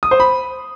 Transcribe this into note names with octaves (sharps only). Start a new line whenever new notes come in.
D#6
C5
B5